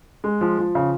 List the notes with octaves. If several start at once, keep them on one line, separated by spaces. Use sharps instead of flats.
G#3
F3
F3
C#3